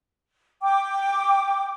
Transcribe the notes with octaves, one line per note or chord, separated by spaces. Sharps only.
G5 D6